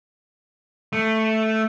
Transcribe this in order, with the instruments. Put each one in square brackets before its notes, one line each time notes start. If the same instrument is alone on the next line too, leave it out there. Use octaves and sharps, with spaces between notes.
[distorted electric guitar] A3